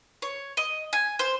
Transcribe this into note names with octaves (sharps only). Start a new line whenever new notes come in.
C#5
D#5
G#5
C5